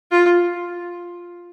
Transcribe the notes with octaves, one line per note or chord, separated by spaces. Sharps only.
F4